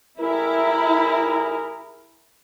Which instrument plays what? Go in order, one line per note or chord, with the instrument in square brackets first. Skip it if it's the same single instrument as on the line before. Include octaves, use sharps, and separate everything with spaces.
[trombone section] A1 G#4 A#4 [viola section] E4